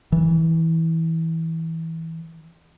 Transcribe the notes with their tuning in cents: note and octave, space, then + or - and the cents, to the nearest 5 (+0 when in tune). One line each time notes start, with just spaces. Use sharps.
E3 -20